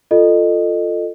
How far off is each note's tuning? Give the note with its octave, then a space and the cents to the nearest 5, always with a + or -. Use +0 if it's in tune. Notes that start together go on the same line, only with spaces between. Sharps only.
F4 +0 A4 +10 D#5 -20